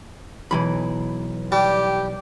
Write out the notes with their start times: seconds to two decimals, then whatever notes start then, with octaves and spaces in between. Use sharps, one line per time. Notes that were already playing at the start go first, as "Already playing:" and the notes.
0.51 B1 E3 B5
1.52 G3 G4